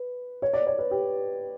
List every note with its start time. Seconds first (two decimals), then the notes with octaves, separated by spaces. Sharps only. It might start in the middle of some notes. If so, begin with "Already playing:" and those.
Already playing: B4
0.42 C#5
0.53 D5
0.67 C#5
0.79 B4
0.91 G4